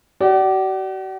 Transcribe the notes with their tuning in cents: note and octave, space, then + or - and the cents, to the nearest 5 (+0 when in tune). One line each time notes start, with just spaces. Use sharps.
F#4 +45 D5 +0